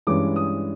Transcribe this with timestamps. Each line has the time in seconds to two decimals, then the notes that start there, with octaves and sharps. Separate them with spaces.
0.07 G2 E3 G#3 C#4 D6
0.36 D#6